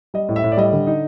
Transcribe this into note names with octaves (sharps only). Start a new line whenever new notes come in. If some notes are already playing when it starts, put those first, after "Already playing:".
G3 D#5
A2
E5
A2
D5
G3 D#5
D3
D#4